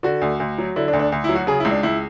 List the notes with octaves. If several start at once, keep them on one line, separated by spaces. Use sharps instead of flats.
D3 F#4
D2
D2
F#3
D3 E4
D4
D2
D4
D2
E4
F#3
F#4
C#3 G#4
E4
C#2
D4
C#2 E4